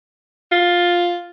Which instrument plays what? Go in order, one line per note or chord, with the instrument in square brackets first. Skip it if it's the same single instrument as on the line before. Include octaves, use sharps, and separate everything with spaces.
[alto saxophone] F4